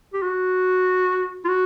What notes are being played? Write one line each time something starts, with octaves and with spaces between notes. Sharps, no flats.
G4
F#4
F4
F#4